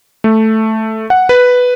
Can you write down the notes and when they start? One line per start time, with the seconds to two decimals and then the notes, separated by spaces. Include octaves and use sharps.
0.24 A3
1.10 F#5
1.29 B4